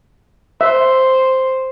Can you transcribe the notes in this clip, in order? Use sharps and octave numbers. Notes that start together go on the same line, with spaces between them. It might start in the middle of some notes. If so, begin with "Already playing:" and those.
C5 E5